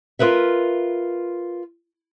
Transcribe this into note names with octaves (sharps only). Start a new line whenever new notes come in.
F4 G#4 A#4 B4 E5